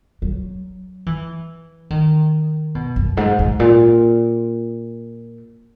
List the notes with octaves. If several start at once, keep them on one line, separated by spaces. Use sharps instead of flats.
F#3
E3
D#3
B2
F#2
G#2
G#2
A#2